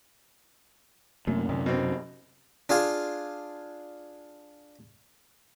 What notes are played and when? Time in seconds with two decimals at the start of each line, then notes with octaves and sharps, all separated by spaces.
1.27 F#2 C3 A3 A#3
1.49 D2 C3 F#3
1.66 B2 C4
2.69 D4 F4 G#4 F5